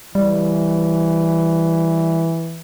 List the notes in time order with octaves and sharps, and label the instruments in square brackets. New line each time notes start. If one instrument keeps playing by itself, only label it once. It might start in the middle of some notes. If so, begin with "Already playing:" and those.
[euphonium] E3 [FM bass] G3